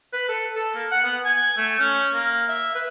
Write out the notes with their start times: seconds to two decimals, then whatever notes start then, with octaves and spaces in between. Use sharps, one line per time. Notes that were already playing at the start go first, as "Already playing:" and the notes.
0.13 B4
0.29 A4
0.55 A4
0.74 A#3
0.91 F#5
1.04 B3
1.25 G#5
1.57 A3
1.79 C#4
2.13 A#3
2.48 E5
2.75 B4